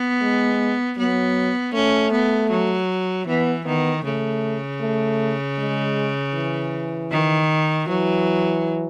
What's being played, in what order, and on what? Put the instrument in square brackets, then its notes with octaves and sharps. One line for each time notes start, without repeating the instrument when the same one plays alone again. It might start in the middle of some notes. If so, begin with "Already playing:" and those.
Already playing: [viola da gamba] B3
[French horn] G#3
[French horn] F#3 [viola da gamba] B3
[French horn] A3 [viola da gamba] C#4
[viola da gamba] B3
F#3
[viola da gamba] E3 [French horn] B3
[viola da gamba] D#3 [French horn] B3
[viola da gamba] C#3 [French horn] A3
[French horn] A3
G#3
E3
[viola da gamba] D#3
[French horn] E3 [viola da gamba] F#3